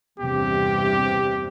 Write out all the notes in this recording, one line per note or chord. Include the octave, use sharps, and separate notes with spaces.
E2 G2 C3 G4